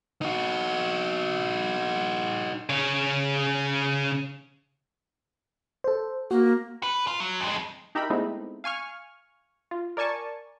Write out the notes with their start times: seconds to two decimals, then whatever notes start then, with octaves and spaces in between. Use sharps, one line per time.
0.22 D#4 F#4
2.69 C#3 C#5
5.84 A4 C5
6.31 A#3 F#4
6.83 B4
7.07 F4
7.20 F#3
7.40 F2 G#3
7.95 D#4 G4 A#4 E5 G5 B5
8.10 G#3 A3 B3 C4 D#4 E4
8.64 F5 G#5 C#6 F6
9.71 F4
9.97 A#4 D5 G#5 A5 C#6